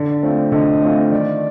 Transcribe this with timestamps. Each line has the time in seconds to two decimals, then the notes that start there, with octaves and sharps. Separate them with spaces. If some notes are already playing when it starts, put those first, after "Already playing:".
Already playing: D3 D5
0.23 A3 C4 F4
0.52 D3 D#5
0.82 A3 C4 F4
1.12 D#3 D5